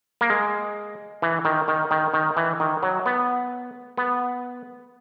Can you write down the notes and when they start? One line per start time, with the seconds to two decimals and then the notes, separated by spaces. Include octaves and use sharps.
0.21 A#3
0.30 G#3
1.22 E3
1.45 D#3
1.68 D#3
1.91 D#3
2.14 D#3
2.37 E3
2.60 D#3
2.83 F#3
3.06 B3
3.97 B3